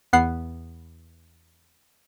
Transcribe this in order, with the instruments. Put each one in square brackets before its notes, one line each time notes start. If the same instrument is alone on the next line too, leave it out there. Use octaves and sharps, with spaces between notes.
[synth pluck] E2 B3 F#5 C7